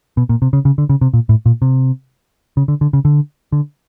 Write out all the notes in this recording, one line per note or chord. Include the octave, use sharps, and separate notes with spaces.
B2
A#2
C3
C#3
C#3
D3
C#3
C3
A#2
A2
A#2
C3
C#3
D3
D3
C#3
D3
D3